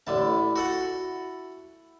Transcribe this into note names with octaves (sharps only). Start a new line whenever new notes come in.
A1 D3 E4 A5
F#4 A4 F#5